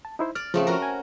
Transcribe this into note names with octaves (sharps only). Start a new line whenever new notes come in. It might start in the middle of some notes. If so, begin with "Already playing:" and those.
A5
D#4 E4 C5
D5 F6
C#3 F3 A3 C4
C#4 F#4 A#4
G#5